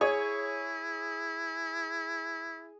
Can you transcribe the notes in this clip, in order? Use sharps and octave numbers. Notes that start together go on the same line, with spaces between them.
E4 G#4 C#5